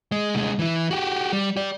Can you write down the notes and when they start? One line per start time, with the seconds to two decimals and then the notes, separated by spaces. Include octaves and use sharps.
0.12 G#3
0.35 C2 G#3
0.59 E3 E4
0.91 F#4 G4
1.33 G3
1.56 G4 D5